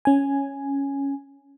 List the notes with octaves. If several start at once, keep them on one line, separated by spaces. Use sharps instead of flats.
C#4 G#5